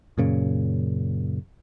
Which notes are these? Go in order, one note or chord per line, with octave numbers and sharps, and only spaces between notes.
F#2 A#2 C#3